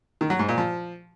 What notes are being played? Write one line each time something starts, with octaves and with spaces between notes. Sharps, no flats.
D#3
F#3
G#2
A#2
F3